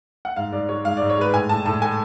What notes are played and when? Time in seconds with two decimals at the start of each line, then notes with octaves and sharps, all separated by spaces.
0.25 F#5
0.36 G#2 F5
0.52 G#2 D5
0.69 G#3 C#5
0.85 G#2 F5
0.97 G#2 D5
1.10 C#5
1.17 G#3 B4
1.33 A2 G#5
1.49 A2 A5
1.66 A2 A5
1.82 A3 G#5